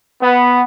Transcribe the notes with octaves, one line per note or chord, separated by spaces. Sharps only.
B3